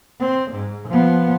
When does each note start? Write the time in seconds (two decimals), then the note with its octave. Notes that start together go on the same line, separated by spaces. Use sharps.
0.20 C4
0.51 G#2
0.88 F3 B3